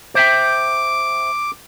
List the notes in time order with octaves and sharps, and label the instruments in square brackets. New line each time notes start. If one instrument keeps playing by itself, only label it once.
[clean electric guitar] C5 E5 G5 [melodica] D6